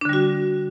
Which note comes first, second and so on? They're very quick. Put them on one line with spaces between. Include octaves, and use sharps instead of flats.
D4 D3 G3 F#4